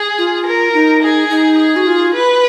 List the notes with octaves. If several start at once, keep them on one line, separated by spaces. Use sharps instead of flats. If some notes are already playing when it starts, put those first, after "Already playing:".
Already playing: G#4
F4
A#4
D#4
G#4
D#4
G#4
F#4
F4
B4